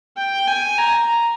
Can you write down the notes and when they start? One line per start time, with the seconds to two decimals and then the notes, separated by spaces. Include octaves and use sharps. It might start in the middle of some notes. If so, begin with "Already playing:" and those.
0.17 G5
0.47 G#5
0.78 A#5